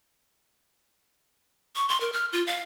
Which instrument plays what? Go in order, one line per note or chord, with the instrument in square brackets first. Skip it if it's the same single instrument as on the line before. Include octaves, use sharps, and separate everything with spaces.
[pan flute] C#6
C6
A#4
F6
F4
F5